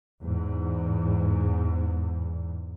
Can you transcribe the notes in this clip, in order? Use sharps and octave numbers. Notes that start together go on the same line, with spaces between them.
E2 G#2